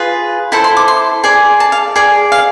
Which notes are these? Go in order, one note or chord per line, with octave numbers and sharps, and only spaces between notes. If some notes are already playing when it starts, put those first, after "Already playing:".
Already playing: F4 G#4 B4
E4 A4 C5 A5
C6
D6
C6
G#4 D5
A5
F5
G#4 D5
F5